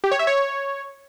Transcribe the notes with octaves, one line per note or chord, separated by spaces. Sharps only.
G4
C#5
E5
C#5